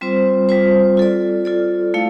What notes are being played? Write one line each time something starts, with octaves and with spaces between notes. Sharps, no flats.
G3 C4 F4 C5
G3 C4 F4 C5
F4 A4 D5
F4 A4 D5
A3 E4 A4 F5